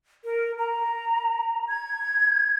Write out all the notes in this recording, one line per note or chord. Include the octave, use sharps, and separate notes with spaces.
A#4
A#5
G#6